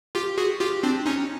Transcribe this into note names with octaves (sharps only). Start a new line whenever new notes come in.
F4 G4
F#4 G#4
F4 G4
C4 D4
C#4 D#4